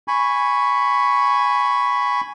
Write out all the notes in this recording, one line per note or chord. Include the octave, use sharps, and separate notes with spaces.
G#5 B5 C#6